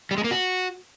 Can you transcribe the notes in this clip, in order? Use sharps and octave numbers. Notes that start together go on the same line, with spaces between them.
G3
G#3
A#3
F#4